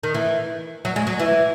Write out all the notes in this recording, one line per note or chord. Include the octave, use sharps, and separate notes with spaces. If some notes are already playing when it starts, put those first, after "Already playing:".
D#3
E3
F#3
G#3
F#3
E3